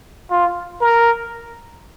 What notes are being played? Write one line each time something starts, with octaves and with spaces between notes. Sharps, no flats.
F4
A#4